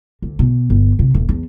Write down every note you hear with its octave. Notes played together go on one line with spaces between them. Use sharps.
D2
B2
G1
C3
D#1
E2